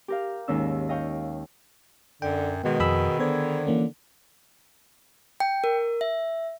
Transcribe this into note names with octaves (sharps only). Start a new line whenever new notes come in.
G4 A#4 F5
D#2 G#2 D#3 C#4 D#4 E6
D#5 F5 G5 C#6
F#2 D3 G5
B2 D#3 G#3 B3
F2 D#3 G#4 B5 E6
D3 B3 C5 G#6
E3 A#3 C#4
G5
A#4
E5